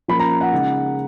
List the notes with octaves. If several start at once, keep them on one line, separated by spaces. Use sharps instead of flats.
F3 A#3 C#4 B5
A#5
F#5
C#3 G#3 D#4